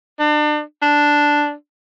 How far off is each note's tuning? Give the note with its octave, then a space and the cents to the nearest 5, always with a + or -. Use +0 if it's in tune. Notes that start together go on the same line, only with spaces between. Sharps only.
D4 +35
D4 +0